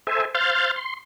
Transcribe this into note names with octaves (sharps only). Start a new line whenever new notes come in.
A4 C5 E5 G#5
C5 F5 F6 G6 A6
C6